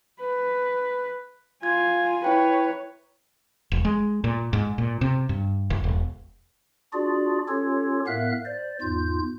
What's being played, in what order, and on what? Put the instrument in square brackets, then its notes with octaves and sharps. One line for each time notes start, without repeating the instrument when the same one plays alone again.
[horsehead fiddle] B4
[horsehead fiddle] F4 G#5 [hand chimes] G#6
[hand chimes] E4 G5 [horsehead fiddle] B4 C#5
[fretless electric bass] E1
G#3
A#2
G#2
A#2
C3
G2
F#1
E1
[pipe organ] D4 F4 F#4 G#4 D5
C#4 F4 G4 A4 C#5
A2 B3 A#4 E5 F5 F#6
C5 D5
E2 G#2 F4 G6